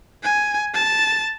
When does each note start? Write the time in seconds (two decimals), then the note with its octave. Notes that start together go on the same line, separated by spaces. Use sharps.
0.23 G#5
0.74 A5